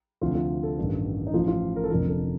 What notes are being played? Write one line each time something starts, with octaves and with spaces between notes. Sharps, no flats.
D2 C3 F3 F4
F4
A4
A1 G2 D#3
D#4
A1 A2 F3 F4
F4
A#4
A4
F1 F2 D3 F3 A#4
A4